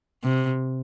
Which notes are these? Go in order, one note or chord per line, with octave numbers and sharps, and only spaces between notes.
C3